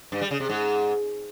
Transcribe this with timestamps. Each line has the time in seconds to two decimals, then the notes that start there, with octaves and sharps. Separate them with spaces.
0.12 G2
0.21 G3
0.31 C#3
0.40 C3
0.49 G#2